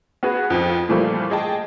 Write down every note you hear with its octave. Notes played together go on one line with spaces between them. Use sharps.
B3 F#4 G#4 B4
F2 F3
A#2 E3 F3 G3 A3 A#3
G#4 D#5 G5 A5